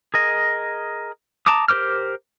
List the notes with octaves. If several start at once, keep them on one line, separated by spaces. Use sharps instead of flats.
G#4 A#4 D#5
A5 A#5 D6 D#6
G4 A#4 C5 D6 F6